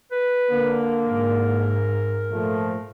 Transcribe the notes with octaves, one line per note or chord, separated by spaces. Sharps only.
B4
D3 A#3
G#2 A#4
A#2 F3 A3